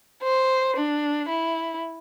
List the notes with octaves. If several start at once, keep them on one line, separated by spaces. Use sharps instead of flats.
C5
D4
E4